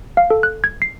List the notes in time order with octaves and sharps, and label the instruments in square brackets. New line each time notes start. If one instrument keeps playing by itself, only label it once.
[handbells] F5
A4
F#6
G#6
C7